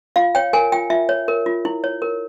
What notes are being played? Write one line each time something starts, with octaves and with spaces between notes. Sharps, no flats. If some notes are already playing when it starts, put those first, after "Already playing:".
F4 F5
C#5 G5
A#4 G#5
F4 G5
F4 E5
C#5
A#4
F4
E4
C#5
A#4